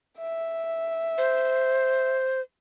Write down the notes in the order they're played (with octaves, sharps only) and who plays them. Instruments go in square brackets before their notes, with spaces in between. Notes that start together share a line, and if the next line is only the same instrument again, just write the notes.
[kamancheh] E5
[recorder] C5